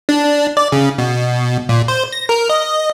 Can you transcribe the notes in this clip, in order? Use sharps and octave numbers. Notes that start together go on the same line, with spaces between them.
D4
D5
C#3
B2
A#2
C5
A#6
A#4
D#5